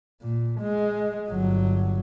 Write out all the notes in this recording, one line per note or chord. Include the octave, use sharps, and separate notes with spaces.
A#2
G#3
G1 F#3